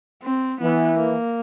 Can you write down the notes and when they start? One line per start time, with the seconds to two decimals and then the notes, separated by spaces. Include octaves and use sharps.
0.23 C4
0.61 E3 B3
0.99 A#3